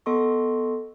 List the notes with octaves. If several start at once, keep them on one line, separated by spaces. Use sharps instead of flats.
B3 A4 D#5 C6 C#6